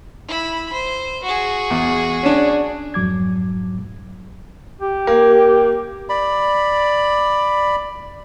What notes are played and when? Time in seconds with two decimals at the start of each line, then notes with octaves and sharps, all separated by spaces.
0.27 E4 B5
0.72 C5
1.23 F#4 G#4
1.70 E2
2.23 C#4 D4
2.94 F2 G#2 F#3 D6 G#6
4.81 G4
5.07 A#3
6.09 D5 B5